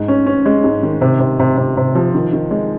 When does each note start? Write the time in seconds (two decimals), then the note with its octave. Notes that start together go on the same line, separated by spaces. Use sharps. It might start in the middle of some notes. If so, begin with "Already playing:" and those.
Already playing: G#2
0.08 C#4
0.26 C#4
0.46 G#3
0.64 G#2
0.83 D#3
1.01 C3
1.20 C3
1.39 C3
1.57 C3
1.77 C3
1.95 F3
2.15 D#3
2.33 D#3
2.51 G#3